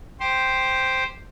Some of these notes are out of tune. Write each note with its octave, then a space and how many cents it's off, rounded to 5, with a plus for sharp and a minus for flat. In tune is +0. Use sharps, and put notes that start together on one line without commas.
G4 +0 C5 +0